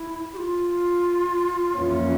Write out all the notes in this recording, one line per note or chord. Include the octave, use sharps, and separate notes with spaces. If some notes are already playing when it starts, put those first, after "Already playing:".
Already playing: E4
G4
F4
F2 E3 A#3 C#4